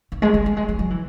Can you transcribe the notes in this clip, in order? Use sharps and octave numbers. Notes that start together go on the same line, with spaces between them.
D#3
G#3
G3
G3
G#3
F#3
F#3
E3